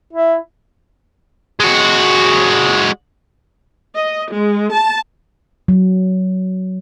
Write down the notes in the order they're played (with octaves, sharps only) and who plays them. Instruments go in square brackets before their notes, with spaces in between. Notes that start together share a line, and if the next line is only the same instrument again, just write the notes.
[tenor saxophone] E4
[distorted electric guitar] G#3 F#4
[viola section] D#5
G#3
A5
[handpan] F#3